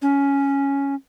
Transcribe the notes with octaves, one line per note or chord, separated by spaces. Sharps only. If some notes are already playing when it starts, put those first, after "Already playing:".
C#4